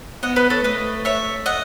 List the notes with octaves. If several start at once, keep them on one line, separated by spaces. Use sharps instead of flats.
B3 D#5 F#5
B4 D#5
A4 C#5
A3 B4 D#5
C#5 E5
D#5 F#5